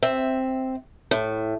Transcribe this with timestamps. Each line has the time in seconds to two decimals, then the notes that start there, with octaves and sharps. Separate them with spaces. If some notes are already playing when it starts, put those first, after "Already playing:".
0.03 C4 E5
1.11 A2